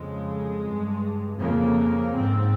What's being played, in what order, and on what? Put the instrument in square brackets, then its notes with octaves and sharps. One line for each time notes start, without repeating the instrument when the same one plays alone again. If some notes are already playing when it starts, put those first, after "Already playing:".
Already playing: [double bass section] F2 C#3 G#3
G2
F2 C#3 A#3
G#2 C4